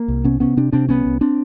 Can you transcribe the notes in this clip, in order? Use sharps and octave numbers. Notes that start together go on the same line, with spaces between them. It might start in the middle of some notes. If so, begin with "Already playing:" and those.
Already playing: A#3
C2
C3 B3 C#4
C3 B3 C#4
C3 C4 D4
C3 C4 D4
C2 B3 C#4
C2
C4 D4